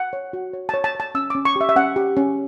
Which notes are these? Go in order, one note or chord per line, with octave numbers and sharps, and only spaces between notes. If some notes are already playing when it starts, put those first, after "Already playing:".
Already playing: F#5
C#5
F#4
C#5
C#5 A5
A5
C#5 A5
C#4 E6
C#4 D6
C#6
G4 E5
E5
C#4 F#5
G4
C#4